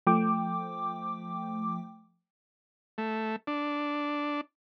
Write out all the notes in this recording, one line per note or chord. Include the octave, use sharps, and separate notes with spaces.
F3 A3 G5 D6
A3
D4